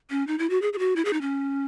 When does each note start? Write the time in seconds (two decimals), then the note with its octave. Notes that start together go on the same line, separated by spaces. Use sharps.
0.10 C#4
0.27 D#4
0.39 E4
0.50 F#4
0.62 G#4
0.73 G#4
0.79 F#4
0.96 E4
1.05 G#4
1.13 D#4
1.21 C#4